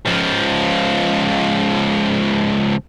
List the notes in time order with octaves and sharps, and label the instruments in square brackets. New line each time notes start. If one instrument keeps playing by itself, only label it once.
[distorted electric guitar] C#2 F3